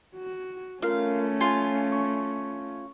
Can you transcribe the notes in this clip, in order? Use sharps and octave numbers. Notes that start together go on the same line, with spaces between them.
F#4
A3 C#4 F4 A#4 F5
F4 G#5
C#6